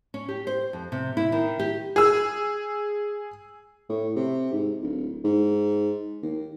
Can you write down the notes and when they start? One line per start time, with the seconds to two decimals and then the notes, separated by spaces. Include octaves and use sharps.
0.14 C#4
0.29 G4
0.47 C5
0.73 F2
0.92 C3
1.17 E4
1.32 D#3
1.59 G4
1.96 G#4 E6
3.89 A2
4.16 C3
4.52 G#2
4.82 D1
5.25 G#2
6.23 D#2